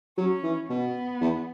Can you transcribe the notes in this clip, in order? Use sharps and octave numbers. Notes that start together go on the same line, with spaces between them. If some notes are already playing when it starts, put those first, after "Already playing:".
F#3 C#4
E3
B2 B3
E2